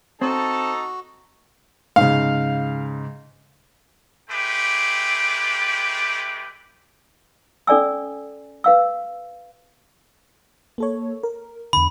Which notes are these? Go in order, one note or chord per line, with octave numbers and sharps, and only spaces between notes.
C4 D#4 F#4 A4 A5
G#2 C#3 F5
G#3 A3 G4 B4 G5 D6
C#4 A4 D5 G#5 E6
B4 F5 E6
A#3 A4 C#5
A#4
E2 D3 B5